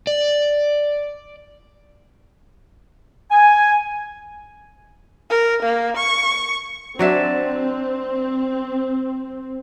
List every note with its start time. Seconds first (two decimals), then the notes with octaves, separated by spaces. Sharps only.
0.07 D5
3.31 G#5
5.30 A#4
5.62 A#3
5.97 C#6
6.99 F#3 C4 D4 E5